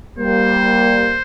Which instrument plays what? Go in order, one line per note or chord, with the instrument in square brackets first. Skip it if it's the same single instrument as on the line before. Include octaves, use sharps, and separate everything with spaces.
[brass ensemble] G3 A#3 [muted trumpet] C5